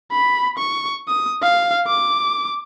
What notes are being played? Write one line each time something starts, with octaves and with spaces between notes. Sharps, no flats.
B5
C#6
D#6
F5
D6